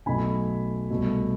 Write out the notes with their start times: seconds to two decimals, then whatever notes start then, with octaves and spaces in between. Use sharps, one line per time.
0.06 B1 B2 A3 G#5 B5
0.90 C2 B2 A3